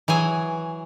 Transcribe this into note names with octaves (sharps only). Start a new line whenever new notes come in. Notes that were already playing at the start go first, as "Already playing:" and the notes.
E3 F#3 G#4 G#5